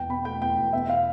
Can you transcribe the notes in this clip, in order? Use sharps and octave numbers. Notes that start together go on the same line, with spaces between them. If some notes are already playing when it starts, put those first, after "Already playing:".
Already playing: E1 E2 G5
B2 B5
A3 G5
E2 G5
E1
B2 E5
F5